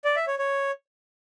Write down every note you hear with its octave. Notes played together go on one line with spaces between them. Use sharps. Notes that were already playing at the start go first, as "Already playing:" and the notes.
D5
E5
C#5
C#5